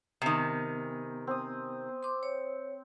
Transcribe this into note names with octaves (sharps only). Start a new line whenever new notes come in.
C3 D#3 B3 G5 G#5
C4 D#6
C6 D6
C#5